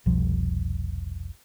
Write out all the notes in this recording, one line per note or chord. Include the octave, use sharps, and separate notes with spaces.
F1 C2 B2 F3